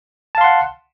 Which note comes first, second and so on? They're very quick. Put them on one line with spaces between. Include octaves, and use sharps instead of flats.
A5 F5 C6 F#5